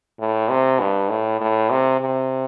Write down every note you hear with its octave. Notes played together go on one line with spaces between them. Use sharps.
A2
C3
G2
A2
A2
C3
C3